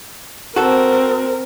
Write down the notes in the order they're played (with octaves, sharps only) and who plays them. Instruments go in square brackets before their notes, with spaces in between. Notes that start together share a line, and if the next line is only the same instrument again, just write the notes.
[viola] C4 A#4 [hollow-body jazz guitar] F#4 A4